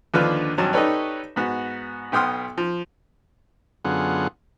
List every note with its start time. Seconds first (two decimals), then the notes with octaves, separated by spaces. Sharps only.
0.14 D#2 D3 F3 D4 B4 F5
0.58 G#1 G2 F#3 A5
0.73 D#4 G4 A4 B4 C#5 D5
1.36 G#2 B3 F#4
2.12 B1 B3 G5 C6 D#6 F6
2.58 F3
3.85 F#2 D3 B3 F4 G#4 F#5